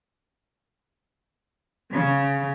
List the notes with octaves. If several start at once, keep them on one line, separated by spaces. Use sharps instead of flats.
C#3